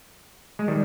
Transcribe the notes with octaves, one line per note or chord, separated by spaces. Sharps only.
G#3
D#3 G3